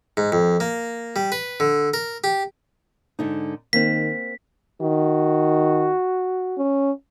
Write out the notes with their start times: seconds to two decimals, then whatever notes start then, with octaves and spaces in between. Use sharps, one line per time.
0.17 G#2
0.32 F2
0.60 A#3
1.16 G3
1.32 B4
1.60 D3
1.94 A#4
2.24 G4
3.19 G#2 D3 D#4
3.73 D#3 A#3 C4 B6
4.81 D#3 F#4
6.58 C#4